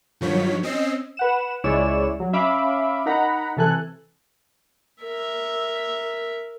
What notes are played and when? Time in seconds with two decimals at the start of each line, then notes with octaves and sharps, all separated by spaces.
0.21 G2 D#3 F3 F#3 C#5 B6
0.63 C4 C#4 D#5 E6 C7
1.17 B4 F#5 E7
1.64 C#2 G#3 E4 C#5 D5 E7
2.20 F#3
2.33 C#4 E5 F5 B5 D6
3.06 D#4 A#4 F#5 A#5 B5
3.57 C3 E3 A4 G#5 F#6
5.03 A#4 E5